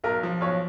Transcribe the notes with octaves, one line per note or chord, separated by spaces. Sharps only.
B1 A#4
F3
B1 C#5